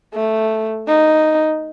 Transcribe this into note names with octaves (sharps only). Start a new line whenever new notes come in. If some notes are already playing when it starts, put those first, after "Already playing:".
A3
D#4